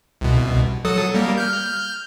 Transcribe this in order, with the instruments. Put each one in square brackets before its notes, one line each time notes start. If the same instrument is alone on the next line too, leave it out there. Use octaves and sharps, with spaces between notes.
[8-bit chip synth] C2 B2
F#3 A4 D#6
G3 A#3
F6 G6